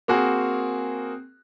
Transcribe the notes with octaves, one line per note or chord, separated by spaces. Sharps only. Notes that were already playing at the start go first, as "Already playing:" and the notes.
A#3 C4 F#4 G#4 A#4